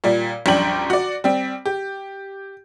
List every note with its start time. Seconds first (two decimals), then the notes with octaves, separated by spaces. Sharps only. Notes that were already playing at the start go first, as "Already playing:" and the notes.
0.04 A#2 G3
0.46 A#1 F#2 G3 D4 G5 F#7
0.90 F#4 D5
1.24 G3 C4
1.65 G4